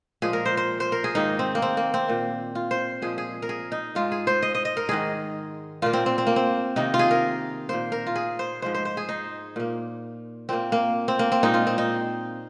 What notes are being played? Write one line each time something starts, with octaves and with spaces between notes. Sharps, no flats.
A#2 F3 G#3 G#4
A#4
C5
C5
C5
A#4
G#4
G#2 D#3 A#3 D#4
C4
A#3
C4
A#3
C4
A#2 A#3
F4
C5
A#2 F3 G#3 G#4
G#4
A#4
G#4
D#4
G#2 G#3 F4
G#4
C5
D#5
D#5
D#5
A#4
G#2 D#3 G#3 G#4
A#2 A#3 F4
C4
C4
C4
A#3
C4
C3 D#3 A#3 D#4
F4
G#4
A#4
A#2 A#3 C5
A#4
F4
G#4
C5
G#2 F3 G#3 C5
C5
C5
G#4
D#4
A#2 A#3
A#2 A#3 C4
A#3
C4
A#3
C4
A#2 G#3 D#4
F4
C4
D#4